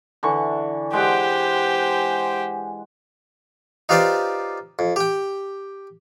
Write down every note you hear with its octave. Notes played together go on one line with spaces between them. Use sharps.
D3 E3 C#6
G#3 G4 C5 F#5
D#4 F4 G4 B4 C5 D5
F2
G4 G5